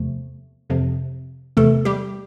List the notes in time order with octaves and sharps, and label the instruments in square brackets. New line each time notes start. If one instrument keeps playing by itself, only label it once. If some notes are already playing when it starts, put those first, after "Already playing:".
Already playing: [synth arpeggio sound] E2 C3 F3 A3
F2 C3 F3
E2 C3 E3 A3 A4
G3 G4